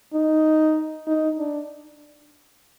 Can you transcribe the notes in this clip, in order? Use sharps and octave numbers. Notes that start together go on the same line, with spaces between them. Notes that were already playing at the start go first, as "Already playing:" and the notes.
D#4
D#4
D4